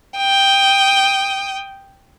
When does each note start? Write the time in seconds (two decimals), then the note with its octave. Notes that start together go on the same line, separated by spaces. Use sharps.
0.18 G5 D#6